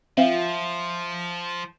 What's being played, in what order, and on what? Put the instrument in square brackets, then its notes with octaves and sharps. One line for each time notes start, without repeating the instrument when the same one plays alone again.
[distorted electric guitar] F3 [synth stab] C4 F4 [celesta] E5 F5 G5